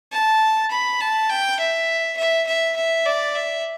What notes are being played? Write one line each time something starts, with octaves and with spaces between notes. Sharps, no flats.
A5
B5
A5
G5
E5
E5
E5
E5
D5
E5